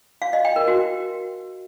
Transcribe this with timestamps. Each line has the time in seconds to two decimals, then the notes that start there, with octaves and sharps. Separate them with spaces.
0.22 F5
0.33 D#5
0.45 G5
0.56 A#4
0.68 F#4